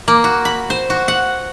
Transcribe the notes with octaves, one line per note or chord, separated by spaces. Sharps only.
A#3
F#4
B5
C5
F#4
F#5